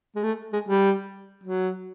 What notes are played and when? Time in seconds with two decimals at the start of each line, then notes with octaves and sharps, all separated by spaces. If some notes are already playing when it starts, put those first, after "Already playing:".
0.16 G#3
0.23 A3
0.53 G#3
0.69 G3
1.43 F#3